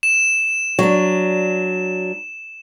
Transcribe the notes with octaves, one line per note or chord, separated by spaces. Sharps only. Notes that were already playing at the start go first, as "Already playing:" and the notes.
E7
F#3 D4